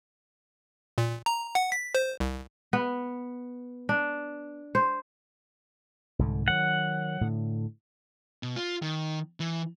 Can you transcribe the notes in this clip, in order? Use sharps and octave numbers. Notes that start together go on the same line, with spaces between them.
A#2
A#5
F#5
B6
C5
C2
B3
D4
C5
C2 G#2 D3
D#3 F#3 F#5
A2 D3
B2
F4
D#3
E3